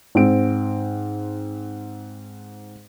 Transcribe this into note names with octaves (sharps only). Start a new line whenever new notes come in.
G#2 C4 D7